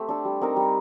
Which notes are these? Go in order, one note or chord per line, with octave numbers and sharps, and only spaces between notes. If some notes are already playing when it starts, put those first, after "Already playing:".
Already playing: A3 C4 G4
D4 A4
G3
C4 D#4 A#4
G3